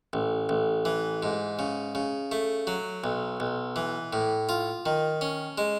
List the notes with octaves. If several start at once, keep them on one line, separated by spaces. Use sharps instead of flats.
A1
A1
E3
G#2
C#3
C#3
A3
F#3
B1
B1
E3
A2
F4
D#3
C#4
G#3